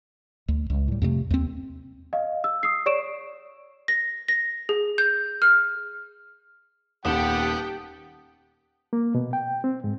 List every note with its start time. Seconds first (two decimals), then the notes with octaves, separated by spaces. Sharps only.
0.48 D2
0.70 C#2
0.88 A2 G3
1.02 F2 C3 G#3 A3
1.30 D#2 G#3 C4
2.13 D#5 F5
2.44 E6
2.63 D#6 E6 C7
2.86 C#5 D5 C#6 D7 E7
3.88 A#6
4.28 A#6
4.69 G#4
4.98 G6
5.42 F6
7.05 D#1 D#2 B3 G4 F#5 G5 A5 E7
8.93 A#3
9.15 B2
9.33 G5
9.64 C4
9.84 G#2